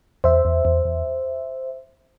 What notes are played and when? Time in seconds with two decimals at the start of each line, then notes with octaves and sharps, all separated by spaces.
0.24 E2 C5 E5
0.45 E2
0.65 E2
0.85 E2